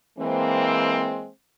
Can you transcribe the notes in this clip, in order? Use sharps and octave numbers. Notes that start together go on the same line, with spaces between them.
E3 G#3 A#3 C4